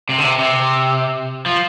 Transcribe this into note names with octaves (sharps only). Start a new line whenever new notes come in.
C3
D3
C3
C3
F3